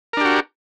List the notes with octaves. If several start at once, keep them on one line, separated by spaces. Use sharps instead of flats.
D4 F#4 G4 A#4